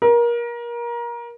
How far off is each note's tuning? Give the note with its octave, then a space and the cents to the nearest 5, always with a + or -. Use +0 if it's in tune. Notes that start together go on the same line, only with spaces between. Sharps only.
A#4 +25